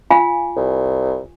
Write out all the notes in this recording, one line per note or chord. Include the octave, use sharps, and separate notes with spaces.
F4 F5 G#5
C2